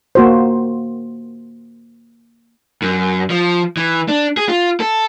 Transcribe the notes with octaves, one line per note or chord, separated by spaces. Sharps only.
A#3 F#4 C5
F#2
F3
E3
D4
G#4
F4
A4